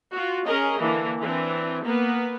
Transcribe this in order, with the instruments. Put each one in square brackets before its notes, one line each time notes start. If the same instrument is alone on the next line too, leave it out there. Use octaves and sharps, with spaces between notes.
[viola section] F4 F#4
C#4 G#4 A#4 D#5
D3 E3 A#3
E3 C4 D4
A#3 B3 B4